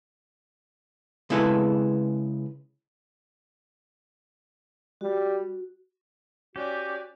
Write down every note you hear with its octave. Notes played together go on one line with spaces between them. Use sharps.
C#3 G#3 B3 E4 A4 B4
G3 F#4
C#4 F#4 G4 D5